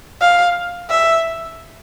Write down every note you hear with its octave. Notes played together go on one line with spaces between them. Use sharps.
F5
E5